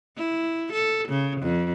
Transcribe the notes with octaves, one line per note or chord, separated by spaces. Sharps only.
E4
A4
C#3
F2